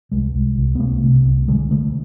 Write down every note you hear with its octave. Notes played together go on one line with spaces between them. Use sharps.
C2 G#3
C2
C2
B3
C2 A3
C3
C2
D3 G#3
D3 A3